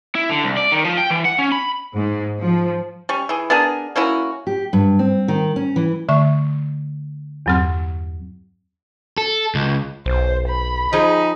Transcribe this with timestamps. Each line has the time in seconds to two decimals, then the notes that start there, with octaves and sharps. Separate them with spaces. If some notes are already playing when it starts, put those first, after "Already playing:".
0.15 E4
0.30 D3
0.44 C2
0.57 D5
0.72 D#3
0.85 F3
0.97 G5
1.10 E3
1.25 F#5
1.38 C#4
1.52 B5
1.96 G#2
2.41 F3
3.09 G3 C#4 C#6
3.29 E3 G#4
3.50 B3 D4 G#4 A#4
3.96 A#3 C#4 E4 F#4
4.47 G4
4.73 G2
4.99 C4
5.28 D#3
5.56 C#4
5.76 E3
6.09 D3 A3 E5 C#6
7.46 E2 G2 F#3 C4 F6
9.18 A4
9.55 C#2
10.06 B1 C5
10.48 B5
10.93 F3 D#4 G#4